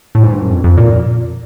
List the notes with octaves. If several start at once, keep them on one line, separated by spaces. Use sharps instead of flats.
A2
G#2
G2
F#2
F2
F2
A#2